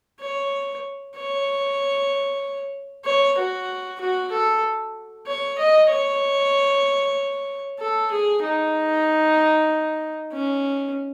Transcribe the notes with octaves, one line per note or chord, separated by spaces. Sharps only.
C#5
C#5
C#5
F#4
F#4
A4
C#5
D#5
C#5
A4
G#4
D#4
C#4